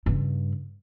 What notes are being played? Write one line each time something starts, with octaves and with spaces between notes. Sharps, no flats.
G2 C#3